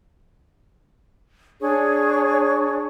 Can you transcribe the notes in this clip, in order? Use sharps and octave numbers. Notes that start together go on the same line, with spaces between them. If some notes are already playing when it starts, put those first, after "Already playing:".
D4 G#4 C#5 C#6